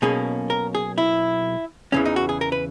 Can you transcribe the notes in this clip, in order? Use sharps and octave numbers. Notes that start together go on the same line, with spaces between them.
B1 B2 A#3 C#4 G#4
A#4
G#4
E4
E2 C#3 E3 C#4
D#4
F#4
G#4
A#4
B4